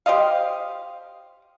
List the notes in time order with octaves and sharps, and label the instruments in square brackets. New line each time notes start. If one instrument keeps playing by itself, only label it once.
[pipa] G4 C5 D#5 F5